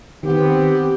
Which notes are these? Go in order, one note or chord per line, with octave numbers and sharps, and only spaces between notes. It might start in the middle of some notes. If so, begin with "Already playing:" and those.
D#3 B3 C4 G4